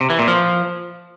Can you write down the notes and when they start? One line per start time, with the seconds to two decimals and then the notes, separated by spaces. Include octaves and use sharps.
0.01 C3
0.10 E3
0.19 A#2
0.28 F3